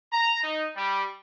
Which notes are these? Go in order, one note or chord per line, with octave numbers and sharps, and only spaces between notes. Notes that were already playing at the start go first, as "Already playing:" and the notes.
A#5
D#4
G3